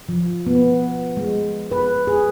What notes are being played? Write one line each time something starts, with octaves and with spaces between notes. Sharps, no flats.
F3
B3
G#3
B4
G#4